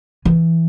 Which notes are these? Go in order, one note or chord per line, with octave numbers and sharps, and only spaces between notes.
E3